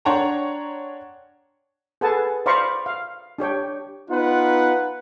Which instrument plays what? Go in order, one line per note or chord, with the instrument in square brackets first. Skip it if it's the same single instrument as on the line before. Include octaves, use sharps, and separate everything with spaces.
[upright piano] D4 C#5 F#5 G5 A#5 C6
[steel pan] G#4 A4 B4 F#5 G#5 A5
C5 D5 F5 A#5 B5 C#6
F5
D4 G4 C#5 G5
[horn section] B3 D#4 F4 B4 F#5